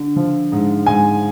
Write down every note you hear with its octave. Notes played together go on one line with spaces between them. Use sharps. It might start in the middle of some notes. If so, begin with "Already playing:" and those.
Already playing: D3
F3
G#2
G#2 G#5